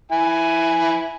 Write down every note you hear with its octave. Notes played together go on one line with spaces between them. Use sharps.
E4 G#5